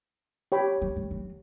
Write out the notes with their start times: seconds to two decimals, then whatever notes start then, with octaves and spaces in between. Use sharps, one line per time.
0.52 G4 C#5 G5 B5
0.82 F#3
0.96 G3
1.11 F#3